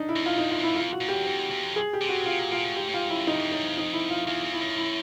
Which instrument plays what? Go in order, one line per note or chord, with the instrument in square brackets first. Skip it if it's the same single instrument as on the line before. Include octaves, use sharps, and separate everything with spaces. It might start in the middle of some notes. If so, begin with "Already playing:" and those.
Already playing: [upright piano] D4 D#4
E4
[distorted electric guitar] E2
[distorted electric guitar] F2 [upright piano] F4
[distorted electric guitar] E2 [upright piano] D#4
[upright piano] F4
[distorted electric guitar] F2 [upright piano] E4
[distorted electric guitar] F2 [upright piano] F4
[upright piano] F#4
[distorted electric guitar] A#2
[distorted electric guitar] E2 [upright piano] G4
[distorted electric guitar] F2
E2
E2
F2
[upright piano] G#4
G4
[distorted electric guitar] C3
[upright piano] F#4
[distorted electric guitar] C3 [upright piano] F4
[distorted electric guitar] A#2
[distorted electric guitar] A#2 [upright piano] F4
[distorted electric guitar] A2
[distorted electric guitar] G#2 [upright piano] G4
[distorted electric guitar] A2
[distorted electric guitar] G#2 [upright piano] F4
[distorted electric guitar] F#2 [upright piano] E4
[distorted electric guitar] F2 [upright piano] D#4
[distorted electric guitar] F2
[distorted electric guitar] F#2 [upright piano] D#4
[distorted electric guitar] F2
[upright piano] D#4
E4
F4
[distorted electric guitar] E2 [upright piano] F4
[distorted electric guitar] E2
[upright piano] E4
[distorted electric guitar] F#2
[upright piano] E4